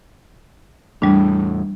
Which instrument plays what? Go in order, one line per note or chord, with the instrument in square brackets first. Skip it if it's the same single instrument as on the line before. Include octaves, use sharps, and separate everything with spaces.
[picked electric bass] E2 A2 [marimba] G3 D4